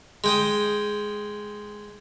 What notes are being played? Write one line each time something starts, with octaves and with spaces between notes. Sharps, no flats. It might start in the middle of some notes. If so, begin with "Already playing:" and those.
G#3 G5 D#6